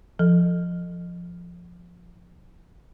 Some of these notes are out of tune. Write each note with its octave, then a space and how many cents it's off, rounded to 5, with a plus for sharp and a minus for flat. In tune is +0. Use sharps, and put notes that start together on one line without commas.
F3 +0 A4 +0